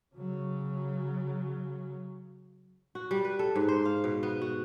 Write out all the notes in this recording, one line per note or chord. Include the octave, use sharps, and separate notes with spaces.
C#3 F#3
F#4
G3
B4
A4
G#2
C5
F5
B2
B3
F#4